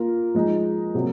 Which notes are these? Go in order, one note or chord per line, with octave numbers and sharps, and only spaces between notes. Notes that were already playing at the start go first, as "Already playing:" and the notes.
Already playing: A#3 F4 A#4
F3 G#3 D#4
C3 F#3 A#3